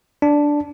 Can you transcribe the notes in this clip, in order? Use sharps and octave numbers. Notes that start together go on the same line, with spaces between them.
D4